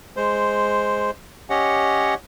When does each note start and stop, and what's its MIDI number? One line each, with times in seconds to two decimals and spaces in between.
0.17 1.11 56
0.17 1.11 72
1.50 2.14 61
1.50 2.14 67
1.50 2.14 73
1.50 2.14 75
1.50 2.14 78